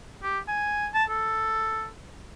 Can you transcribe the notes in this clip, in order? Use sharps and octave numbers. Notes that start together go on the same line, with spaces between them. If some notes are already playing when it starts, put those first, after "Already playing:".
G4
G#5
A5
A4